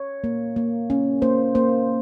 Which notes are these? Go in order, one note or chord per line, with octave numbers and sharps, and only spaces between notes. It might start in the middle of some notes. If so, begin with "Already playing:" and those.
Already playing: C#5
A#3
A#3
C#4
A#3 C5
A#3 C5